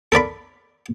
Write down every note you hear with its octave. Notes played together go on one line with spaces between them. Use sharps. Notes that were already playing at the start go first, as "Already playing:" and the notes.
A4 A#4 D5 B5